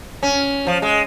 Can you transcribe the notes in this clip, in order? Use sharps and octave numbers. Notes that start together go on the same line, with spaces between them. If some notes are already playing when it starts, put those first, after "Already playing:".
C#4
F3
G#3